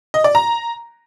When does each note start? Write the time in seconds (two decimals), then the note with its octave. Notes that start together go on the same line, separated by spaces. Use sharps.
0.14 D#5
0.24 D5
0.35 A#5